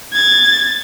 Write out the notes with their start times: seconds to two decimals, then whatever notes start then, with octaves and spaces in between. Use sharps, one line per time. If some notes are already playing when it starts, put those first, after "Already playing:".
0.13 G#6 A6